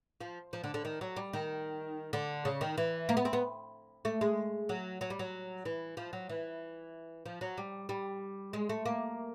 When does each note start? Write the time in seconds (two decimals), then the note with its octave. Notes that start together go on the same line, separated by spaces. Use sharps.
0.21 F3
0.53 F3
0.64 D3
0.74 D3
0.85 D#3
1.01 F#3
1.16 G3
1.33 D#3
2.13 D3
2.45 C#3
2.61 D#3
2.78 E3
3.09 A#3
3.17 B3
3.25 C4
3.33 B3
4.05 A3
4.21 G#3
4.69 F#3
5.01 F#3
5.10 G3
5.19 F#3
5.65 E3
5.97 F3
6.13 F#3
6.29 E3
7.26 F3
7.41 F#3
7.58 G3
7.89 G3
8.53 G#3
8.69 A3
8.86 A#3